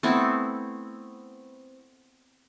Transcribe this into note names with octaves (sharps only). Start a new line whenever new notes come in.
A3 B3 C4 E4